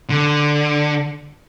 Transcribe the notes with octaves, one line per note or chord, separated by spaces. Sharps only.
D3